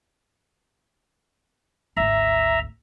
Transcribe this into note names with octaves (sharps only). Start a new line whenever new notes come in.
G#1 D2 E5 A#5